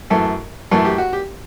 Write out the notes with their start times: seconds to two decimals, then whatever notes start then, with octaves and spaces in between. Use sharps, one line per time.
0.10 F#2 E3 A3 A4
0.71 F#2 E3 A3 A4
0.85 G4
0.98 F#4
1.13 G4